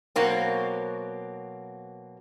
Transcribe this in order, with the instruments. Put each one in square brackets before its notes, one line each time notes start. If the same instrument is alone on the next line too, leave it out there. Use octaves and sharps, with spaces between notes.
[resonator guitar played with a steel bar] B2 F#3 A#3 C4